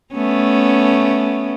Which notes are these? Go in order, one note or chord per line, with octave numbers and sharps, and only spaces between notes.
A3 B3 C#4